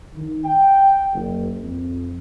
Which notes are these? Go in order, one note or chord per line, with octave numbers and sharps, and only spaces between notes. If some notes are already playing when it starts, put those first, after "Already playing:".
D#3
G5
F#1
F2